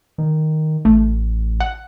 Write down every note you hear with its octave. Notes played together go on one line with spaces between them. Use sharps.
D#3
A1 A3
F#5